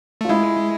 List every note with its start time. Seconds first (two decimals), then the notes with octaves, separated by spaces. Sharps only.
0.21 A3 F4
0.29 G#3 E4